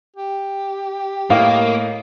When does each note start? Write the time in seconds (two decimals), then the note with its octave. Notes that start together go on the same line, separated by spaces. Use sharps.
0.16 G4
1.30 A2 A#3 D#5 F5 D6